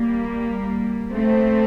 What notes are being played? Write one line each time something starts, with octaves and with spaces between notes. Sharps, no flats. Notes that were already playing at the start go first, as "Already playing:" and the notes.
Already playing: G3 A#3
A3 C4